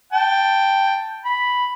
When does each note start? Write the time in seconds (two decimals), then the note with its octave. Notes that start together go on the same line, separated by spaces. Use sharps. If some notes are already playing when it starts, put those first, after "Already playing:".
0.13 G5 A5
1.25 B5